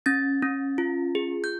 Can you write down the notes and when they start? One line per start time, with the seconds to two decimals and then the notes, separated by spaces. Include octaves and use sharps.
0.06 C#4 A6
0.42 C#4
0.78 F4
1.15 G#4
1.44 G6